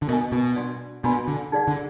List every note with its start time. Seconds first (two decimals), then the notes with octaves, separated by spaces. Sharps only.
0.02 D3
0.08 B2 A#4 D#5 G#5
0.32 B2
0.56 D4 F#4 D5
1.04 B2 D4 F#4 D5 G#5 B5
1.28 D3
1.52 D#4 G#4 D5 F#5
1.68 D3